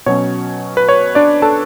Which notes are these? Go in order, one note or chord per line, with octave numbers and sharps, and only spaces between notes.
B2 F#3 C#4 C#5
B4
C#5
D4 D5
A4 A5